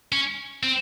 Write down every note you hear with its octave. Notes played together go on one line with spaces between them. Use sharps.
C#4
C4